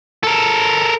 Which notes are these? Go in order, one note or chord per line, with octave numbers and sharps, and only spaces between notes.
A4 A#4